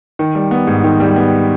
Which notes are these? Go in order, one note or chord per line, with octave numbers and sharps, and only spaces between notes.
D#3
G3
B3
G#2
D#3
G3
B3